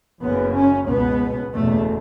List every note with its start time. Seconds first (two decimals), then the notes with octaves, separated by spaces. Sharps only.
0.21 F#1 F#2 C#3 B3
0.55 C#4
0.88 C#2 B2 B3
1.53 F#1 E2 B2 A3